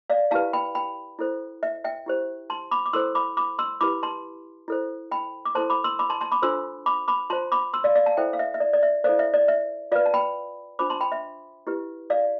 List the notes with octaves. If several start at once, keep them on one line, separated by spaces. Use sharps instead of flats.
D5 F5
E4 G4 B4 F5 A5
G5 B5
G5 B5
E4 A4 C5
E5
E5 G5
E4 G4 C5
A5 C6
B5 D6
D6
E4 A4 C5 C6 E6
B5 D6
B5 D6
C6 E6
E4 G4 B4 B5 D6
A5 C6
E4 A4 C5
G5 B5
D6
E4 A4 C5 A5 C6
B5 D6
C6 E6
B5 D6
A5 C6
A5 C6
B5 D6
D4 F4 A4 C5 C6 E6
B5 D6
B5 D6
F4 C5 A5 C6
B5 D6
C6 E6
D5 F5
D5 F5
F5 A5
E4 A4 C5 E5 G5
F5
E5
E5
D5
D5
E5
E4 A4 C5 D5 F5
E5
D5
E5
F4 B4 D5 F5
A5
G5 B5
D4 F4 C5 B5 D6
A5 C6
G5 B5
E5
E4 G4 B4
D5 F5